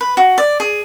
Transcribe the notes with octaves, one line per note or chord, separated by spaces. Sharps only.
B4
F#4
D5
G#4